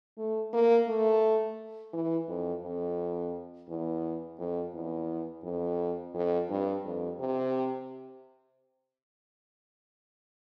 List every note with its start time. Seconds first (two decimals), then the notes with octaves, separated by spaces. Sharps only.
0.18 A3
0.53 A#3
0.88 A3
1.93 E3
2.29 F2
2.63 F2
3.69 E2
4.39 F2
4.74 E2
5.44 F2
6.14 F2
6.49 G2
6.84 F2
7.19 C3